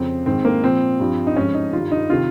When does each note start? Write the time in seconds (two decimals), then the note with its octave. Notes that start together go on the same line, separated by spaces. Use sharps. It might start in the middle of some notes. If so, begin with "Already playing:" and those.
Already playing: F2 C#3 F3 C4
0.26 G#2 D#3 C4
0.45 A#3
0.63 A#2 F3 C4
1.00 G2 F3
1.27 D#4
1.36 G#2 F3 C#4
1.55 D#4
1.73 G2 D#3 F4
1.92 D#4
2.10 C3 D#3 F4